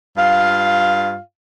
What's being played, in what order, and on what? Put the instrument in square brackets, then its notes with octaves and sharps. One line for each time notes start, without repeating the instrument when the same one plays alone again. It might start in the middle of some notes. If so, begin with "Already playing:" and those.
[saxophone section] G2 F4 F5